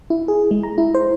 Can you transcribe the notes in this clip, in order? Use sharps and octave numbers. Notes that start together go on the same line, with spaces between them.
E4
G#4
G#3
A#5
E4
C5